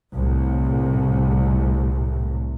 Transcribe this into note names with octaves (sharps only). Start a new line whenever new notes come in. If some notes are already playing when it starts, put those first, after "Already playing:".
C2 A2